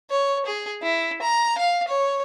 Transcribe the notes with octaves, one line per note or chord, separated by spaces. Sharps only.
C#5
G#4
E4
A#5
F5
C#5